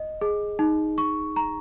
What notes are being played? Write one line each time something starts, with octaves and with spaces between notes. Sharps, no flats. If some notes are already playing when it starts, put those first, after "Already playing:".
Already playing: D#5
G#4
D#4
C#6
A#5